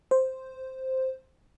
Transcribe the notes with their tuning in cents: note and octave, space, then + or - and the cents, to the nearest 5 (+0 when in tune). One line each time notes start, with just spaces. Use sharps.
C5 +0